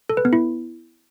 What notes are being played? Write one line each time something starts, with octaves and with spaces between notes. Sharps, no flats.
A4
B4
B3
E4